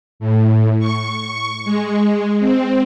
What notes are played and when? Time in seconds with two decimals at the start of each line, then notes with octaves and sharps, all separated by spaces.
0.20 A2
0.79 C#6
1.65 G#3
2.40 C4